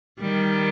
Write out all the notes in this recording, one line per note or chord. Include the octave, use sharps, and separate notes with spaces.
D#3 G3